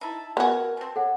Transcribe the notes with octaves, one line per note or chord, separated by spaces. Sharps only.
D#4 E4 A5
C3 A3 B3 F#4 A#4 G#5
D3 C4 A5
A4 C#5 F#5